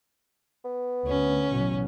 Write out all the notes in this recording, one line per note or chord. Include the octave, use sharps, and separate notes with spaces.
B3
D2 C#4
A1 B2 F#3